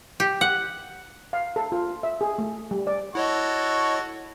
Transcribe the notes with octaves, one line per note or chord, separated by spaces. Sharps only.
G4
F#5
F5
A4
F4
E5
G#4
A3
G3
D5
E4 F#4 A4 C#5 D#5 C#6